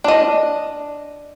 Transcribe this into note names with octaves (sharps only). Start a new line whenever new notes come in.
D4 D#5